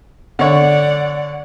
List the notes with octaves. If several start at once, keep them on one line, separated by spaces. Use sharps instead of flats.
D3 C#5 D5 F#5